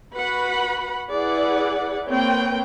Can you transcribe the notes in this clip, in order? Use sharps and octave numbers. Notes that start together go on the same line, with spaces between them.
F#4 B4 F#5 B5
E4 G#4 B4 D5 F#5
A#3 C4 B4 C#5 G5